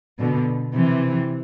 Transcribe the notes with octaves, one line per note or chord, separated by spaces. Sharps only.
B2 D3
C3 E3